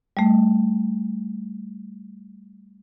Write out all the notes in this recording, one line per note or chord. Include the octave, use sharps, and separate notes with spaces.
G3 A3